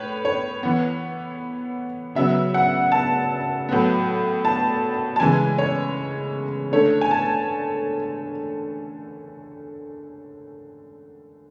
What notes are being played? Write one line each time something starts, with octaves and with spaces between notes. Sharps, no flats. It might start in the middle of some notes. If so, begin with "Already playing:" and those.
Already playing: A2 B4 C#5
C#5
E3 B3
C#3 F#3 B3 E5
F#5
A5
A2 F#3 B3
A5
A5
C#3 E3 G#3 G#5
C#5
D3 A3 C#4 C#5
G#5
A5